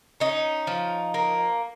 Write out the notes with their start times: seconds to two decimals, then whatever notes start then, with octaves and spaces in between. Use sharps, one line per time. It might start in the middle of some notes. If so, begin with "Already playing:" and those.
0.20 C#4 D#4
0.67 F3
1.14 A#3